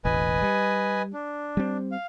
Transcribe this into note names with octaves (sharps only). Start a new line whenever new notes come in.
E1 A1 B4 D#5 G#5
G3
D4
G3 C4
F5